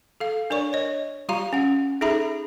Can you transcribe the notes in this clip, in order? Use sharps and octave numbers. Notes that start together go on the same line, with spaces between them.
A4 F5
D4 A#4 C#5 D5 C#6
C#5 D#5
G3 F4 G4 F5 A#5
C#4 F#5
D#4 G#4 A4 E5 A#5 B5